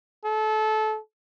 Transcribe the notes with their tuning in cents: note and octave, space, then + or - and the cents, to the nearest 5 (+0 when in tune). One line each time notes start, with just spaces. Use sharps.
A4 -25